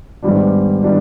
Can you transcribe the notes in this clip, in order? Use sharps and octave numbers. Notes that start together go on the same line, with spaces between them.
G#2 D#3 G3 B3 D4
D#3 G3 B3 D4